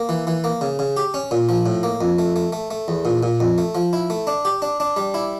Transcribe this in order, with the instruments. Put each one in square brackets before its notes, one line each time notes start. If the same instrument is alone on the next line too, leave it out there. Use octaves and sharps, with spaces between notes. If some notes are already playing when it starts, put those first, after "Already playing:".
Already playing: [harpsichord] A#3
E3
E3
A#3
C#3
C#3
G4
C#4
A#2
F3
A2
A#3
F2
A3
A3
A3
A3
E2
A#2
A#2
F2
A3
F3
E4
A3
D4
G4
D4
D4
G3
E4